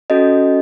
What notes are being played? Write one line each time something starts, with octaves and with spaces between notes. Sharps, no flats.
C#4 F#4 A4 D#5